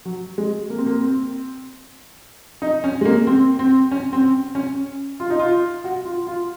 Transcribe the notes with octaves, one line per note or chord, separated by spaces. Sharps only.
F#3
G#3
A#3
C4
A#3
C4
D#4
C#4
G#3
A#3
C4
C4
C#4
C4
C#4
F4
D#4
F4
F#4
F4
F4